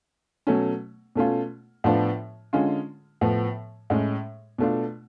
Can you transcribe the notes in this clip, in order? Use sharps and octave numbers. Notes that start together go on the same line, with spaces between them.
B2 F#3 A3 C#4
B2 A3 C#4 F4
A2 F3 B3 D4 F4
D3 G#3 C#4 F4
A2 F3 B3
A2 G#3 C#4
B2 A3 D4 F4